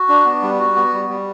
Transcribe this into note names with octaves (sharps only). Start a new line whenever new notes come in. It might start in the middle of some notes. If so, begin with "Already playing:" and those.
Already playing: F#4
D4
B3
G3
F#4
B3
G3
G3